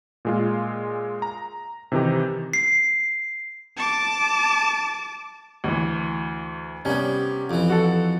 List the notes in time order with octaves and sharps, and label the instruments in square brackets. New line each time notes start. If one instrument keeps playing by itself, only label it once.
[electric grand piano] A#2 G#3 F4
A#5
C3 D#3 E3 D#4 G4
[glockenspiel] C7
[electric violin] A5 D6
[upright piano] D2 E3
[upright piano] C3 C#4 [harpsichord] G3 B3
[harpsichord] F2 E3
[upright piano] F#4 A4